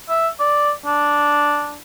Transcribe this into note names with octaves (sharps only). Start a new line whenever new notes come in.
E5
D5
D4